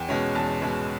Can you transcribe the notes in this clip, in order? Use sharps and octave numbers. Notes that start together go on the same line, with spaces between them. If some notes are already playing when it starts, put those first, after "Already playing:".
Already playing: E2 G5
B2 G#3 C#4
E2 A5
B2 G#3 C#4